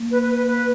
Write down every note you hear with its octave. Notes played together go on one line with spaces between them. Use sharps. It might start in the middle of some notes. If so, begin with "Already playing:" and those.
Already playing: A#3
B4
B4
B4
B4